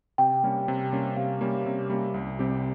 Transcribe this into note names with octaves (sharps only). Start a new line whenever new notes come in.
C3 G5
G3 A#3 C#4
C3
G3 A#3 C#4
C3 F5
G3 A#3 C#4
C3
G3 A#3 C#4
C2
C3 G3 C4 G4